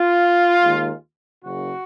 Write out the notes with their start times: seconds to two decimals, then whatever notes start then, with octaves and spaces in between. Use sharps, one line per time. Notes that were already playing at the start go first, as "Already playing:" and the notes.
Already playing: F4
0.61 D#2 D#3 G#3
1.43 F#1 F#2 C#3 F#3 F#4